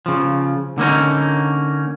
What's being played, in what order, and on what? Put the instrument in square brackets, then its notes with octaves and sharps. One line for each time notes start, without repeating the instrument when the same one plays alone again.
[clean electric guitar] C#3 F3
D3 A#3 C#4 D#4